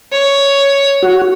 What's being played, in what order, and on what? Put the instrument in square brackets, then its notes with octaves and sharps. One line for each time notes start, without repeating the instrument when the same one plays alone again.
[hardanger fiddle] C#5
[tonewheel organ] F#4